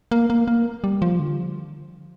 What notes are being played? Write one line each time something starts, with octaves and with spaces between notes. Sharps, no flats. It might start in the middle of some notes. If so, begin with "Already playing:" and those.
A#3
A#3
A#3
G3
F3
D3